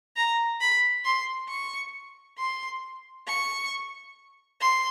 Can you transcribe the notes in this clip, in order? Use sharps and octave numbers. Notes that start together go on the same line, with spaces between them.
A#5
B5
C6
C#6
C6
C#6
C6